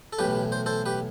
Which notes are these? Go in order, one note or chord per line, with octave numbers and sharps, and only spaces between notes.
A4
B1 A2 E3 G4 B4
C5
A4 C5
G4 B4